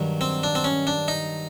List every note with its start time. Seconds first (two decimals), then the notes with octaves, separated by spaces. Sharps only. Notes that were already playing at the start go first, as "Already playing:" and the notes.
Already playing: G2 D#3 F#3
0.21 C4
0.43 D4
0.55 C4
0.64 C#4
0.87 D4
1.08 D#4